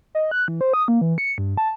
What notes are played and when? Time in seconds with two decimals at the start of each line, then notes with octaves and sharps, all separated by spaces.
0.15 D#5
0.31 F#6
0.48 E3
0.61 C5
0.73 D#6
0.88 A#3
1.01 E3
1.18 C#7
1.38 G2
1.58 A5